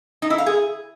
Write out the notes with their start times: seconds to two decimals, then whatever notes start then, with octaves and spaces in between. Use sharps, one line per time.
0.22 D#4
0.30 E4
0.38 F5
0.46 G#4